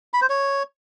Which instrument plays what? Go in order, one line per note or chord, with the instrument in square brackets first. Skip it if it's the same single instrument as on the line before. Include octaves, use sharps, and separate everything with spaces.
[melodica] B5
C5
C#5